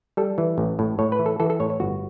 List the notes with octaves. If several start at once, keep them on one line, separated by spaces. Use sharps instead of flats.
G3 A4
E3
A1
A2
A2 C#5
B4
E3
A4
E3 A4
A4
A2 C#5
C#5
G1 F#4